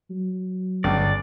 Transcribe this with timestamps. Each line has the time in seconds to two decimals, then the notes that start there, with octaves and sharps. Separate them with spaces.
0.10 F#3
0.84 G1 C#2 D5